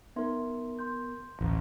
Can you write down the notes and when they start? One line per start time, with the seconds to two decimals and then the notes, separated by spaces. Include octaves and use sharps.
0.16 B3 D#4 A#4 E5 C6
0.79 C6 G6
1.41 A1 D2